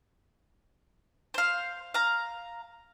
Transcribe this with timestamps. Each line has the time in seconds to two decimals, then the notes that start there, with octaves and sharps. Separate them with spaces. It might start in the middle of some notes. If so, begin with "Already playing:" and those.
1.34 C5 F5
1.94 F5 A#5